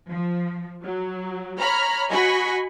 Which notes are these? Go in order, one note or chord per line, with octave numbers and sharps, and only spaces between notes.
F3
F#3
C#5 A#5 B5 F6
F#4 D#5 G#5 B5 C#6